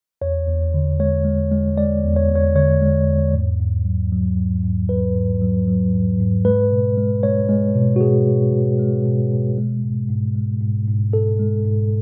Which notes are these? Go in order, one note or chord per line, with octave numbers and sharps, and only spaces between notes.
E2 C#5
E2
D3
G#3 C#5
G#3
G#3
G#3 D5
E2
C#5
E2
C#5
D3 C#5
G#3
E2
G#2
G#2
F#3
F#3
G#2
G#2
F#3 B4
G#2
F#3
F#3
G#2
G#2
G#3 B4
B2
G#3
G#3 C#5
G#3
B2
F#4
B2 G#4
B2
B2
G#3
B2
B2
G#3
G#2
G#2
G#3
G#2
G#2
G#2 A4
G#3
G#2